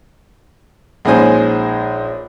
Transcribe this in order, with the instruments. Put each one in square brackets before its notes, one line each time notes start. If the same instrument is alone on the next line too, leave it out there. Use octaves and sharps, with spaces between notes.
[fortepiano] A#1 G#3 C#4 D#4 C5 G#5